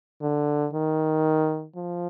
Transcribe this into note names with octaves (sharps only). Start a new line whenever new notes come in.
D3
D#3
F3